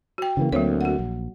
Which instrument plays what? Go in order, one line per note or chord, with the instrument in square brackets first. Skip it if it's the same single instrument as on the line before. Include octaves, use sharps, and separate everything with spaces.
[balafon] F#4 G5
[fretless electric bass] C#3 E3 A#3
[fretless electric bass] D2 A#3 C4 [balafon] F#3 C#5
[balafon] F#4 F#5
[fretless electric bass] A#1